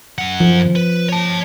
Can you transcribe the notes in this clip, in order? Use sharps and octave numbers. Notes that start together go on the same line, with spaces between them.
F#2 F#5
F3
B4
C#5 A5